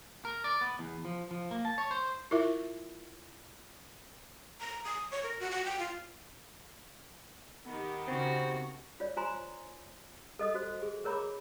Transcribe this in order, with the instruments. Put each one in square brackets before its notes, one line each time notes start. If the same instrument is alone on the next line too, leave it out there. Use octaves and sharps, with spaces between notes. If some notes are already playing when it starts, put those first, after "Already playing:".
[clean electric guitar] A#4
D5
B3
E2
F3
F3
A#3
A5
C#5
C5
[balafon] E4 F4 A#4 E5
[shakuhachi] A#5
D#6
C#5
A#4
F#4
F#4
G5
F4
[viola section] D#3 G4 [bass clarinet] B3
[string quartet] C#3 F#4 [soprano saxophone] C4
[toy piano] F4 C#5 D5
F4 C5 G#5 A#5 C6
A4 D#5 D#6
F#4 C5
G#4
G#4 A#4 C#5 A#5 B5 D6